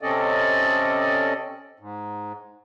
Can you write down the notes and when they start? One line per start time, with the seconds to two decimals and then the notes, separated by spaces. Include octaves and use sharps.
0.02 C3 C4 C#4 A4 D5 D#5
1.80 G#2